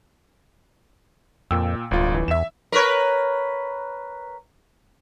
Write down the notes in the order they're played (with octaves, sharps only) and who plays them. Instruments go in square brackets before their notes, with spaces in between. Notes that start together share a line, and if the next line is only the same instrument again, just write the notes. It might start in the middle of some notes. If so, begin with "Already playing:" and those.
[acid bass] F2 [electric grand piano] A#2 G5 E6
[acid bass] D1 [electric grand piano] G1 F4
[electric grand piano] E3
[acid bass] E2 [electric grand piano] E5 E7
[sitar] A#4 B4 C#5